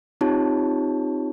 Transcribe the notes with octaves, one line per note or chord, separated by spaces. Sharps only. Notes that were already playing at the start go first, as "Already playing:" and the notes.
C4 D#4 F4 G4 C#5 A5